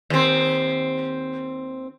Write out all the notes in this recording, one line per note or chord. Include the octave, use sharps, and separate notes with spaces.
D#2 C4